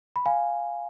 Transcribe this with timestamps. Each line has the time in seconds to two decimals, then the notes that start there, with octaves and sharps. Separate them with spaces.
0.16 B5
0.26 F5 G#5